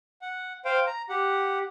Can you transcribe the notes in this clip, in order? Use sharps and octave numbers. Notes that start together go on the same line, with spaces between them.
F#5
C5 F5 G5
A#5
G4 F#5